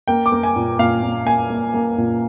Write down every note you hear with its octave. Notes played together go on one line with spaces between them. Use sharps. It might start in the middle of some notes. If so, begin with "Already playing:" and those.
A#3 G5
D6
A#3
G#5
A#2
A#2 F5
A#2
A#3 G#5
A#3
A#3
A#2